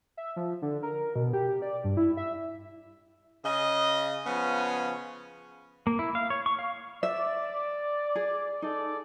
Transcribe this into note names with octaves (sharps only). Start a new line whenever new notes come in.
E5
F3
D3
A#4
B2
G4
D5
G2
E4
E5
C#3 D#5
C#3 F3 B3 C#4
A#3
E4
F5
C#5
C#6
F5
D5 E5
G#4
D#4 G#4 A4 D5